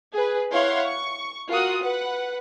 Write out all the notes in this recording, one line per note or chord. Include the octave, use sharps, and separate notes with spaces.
G#4 B4
E4 C#5 F5 F#5 C6
C#6
F4 F#4 A#4 F#5 D#6
B4 F#5